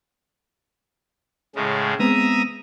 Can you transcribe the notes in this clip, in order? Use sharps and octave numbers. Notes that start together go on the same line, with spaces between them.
A2 C#3 G#3
G#3 B3 C4 E5 A#5 D#6